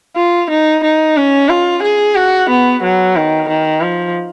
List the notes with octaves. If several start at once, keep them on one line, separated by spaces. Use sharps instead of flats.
F4
D#4
D#4
C#4
F4
G#4
F#4
B3
F#3
D#3
D#3
F3